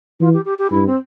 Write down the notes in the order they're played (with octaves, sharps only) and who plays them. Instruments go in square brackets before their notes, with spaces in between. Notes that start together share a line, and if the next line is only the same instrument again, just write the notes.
[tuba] E3 [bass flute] F4
[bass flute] G4
G4
G4
[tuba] G2 [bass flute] E4
[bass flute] C4